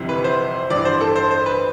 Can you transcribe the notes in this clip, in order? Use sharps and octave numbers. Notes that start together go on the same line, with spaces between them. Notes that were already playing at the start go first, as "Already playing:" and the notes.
Already playing: G1 F2 C3 E3
B4
C5
A1 G2 E3 D5
C5
A4
C5
C5
B4